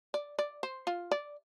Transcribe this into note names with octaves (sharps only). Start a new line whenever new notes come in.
D5
D5
C5
F4
D5